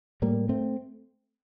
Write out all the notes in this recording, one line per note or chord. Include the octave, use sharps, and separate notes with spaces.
A2 G3 A#3
A3 C4